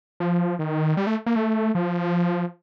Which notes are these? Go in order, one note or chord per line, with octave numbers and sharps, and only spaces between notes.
F3
D#3
G3
A3
A#3
A3
F3